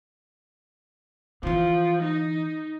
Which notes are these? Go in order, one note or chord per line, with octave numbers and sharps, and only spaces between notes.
D3 E3 F3
D#4